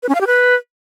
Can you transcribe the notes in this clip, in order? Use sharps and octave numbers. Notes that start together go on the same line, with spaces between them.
B4
C#4
F5
G4
B4